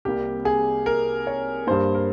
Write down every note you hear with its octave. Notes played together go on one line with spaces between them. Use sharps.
C2 C3 G3 A#3 G4
G#4
A#4
C#5
G2 G3 A#3 C5
A#4